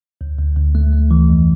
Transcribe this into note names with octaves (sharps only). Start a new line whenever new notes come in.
D2
D2
D2
A3
A3
E3
F2